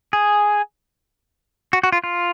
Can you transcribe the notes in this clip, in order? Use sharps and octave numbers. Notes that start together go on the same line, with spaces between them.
G#4
F#4
F#4
F4
F4